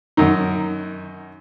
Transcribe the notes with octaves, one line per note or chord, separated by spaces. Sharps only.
F#2 D#3 D#4